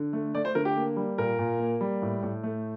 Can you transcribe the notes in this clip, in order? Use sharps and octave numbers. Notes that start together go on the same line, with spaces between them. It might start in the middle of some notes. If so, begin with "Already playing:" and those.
Already playing: D3
A3
A3 D5
C5
D3 A#4
G4
A#3
G3
A#2 A#4
A#2
A#3
G3
A2
A2
A3